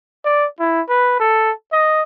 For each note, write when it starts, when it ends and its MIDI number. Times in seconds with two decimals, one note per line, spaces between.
0.25 0.46 74
0.59 0.82 64
0.89 1.16 71
1.19 1.52 69
1.72 2.02 75